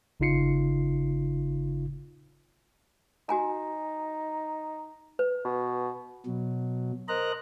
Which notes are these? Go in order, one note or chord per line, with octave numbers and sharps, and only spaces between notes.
G1 C#3 D#4 F4 C7 C#7
D#4 F#4 G#5 A#5
B4
B2
B2 F#3
A#4 C5 D#5 A#5 F#6